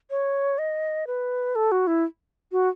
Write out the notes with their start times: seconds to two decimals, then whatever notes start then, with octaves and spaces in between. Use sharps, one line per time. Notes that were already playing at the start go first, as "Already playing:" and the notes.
0.10 C#5
0.58 D#5
1.07 B4
1.55 A4
1.72 F#4
1.87 E4
2.52 F#4